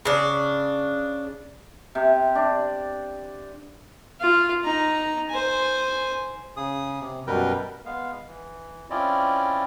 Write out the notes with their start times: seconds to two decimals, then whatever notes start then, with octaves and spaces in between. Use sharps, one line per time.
0.05 C#3 D4
1.95 C3
2.35 D4
4.21 F4 F5
4.64 D#4 A#5
5.30 C5 G#5
6.57 C#3 G#4 D#6
7.00 C3
7.27 F#2 B2 G3 A#4 B4 G5
7.86 G#3 B3 F5
8.27 E3
8.90 C4 C#4 E4 F4 D5 D#5